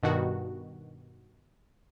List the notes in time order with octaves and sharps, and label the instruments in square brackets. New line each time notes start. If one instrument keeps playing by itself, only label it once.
[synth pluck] G2 B2 D#3 F#4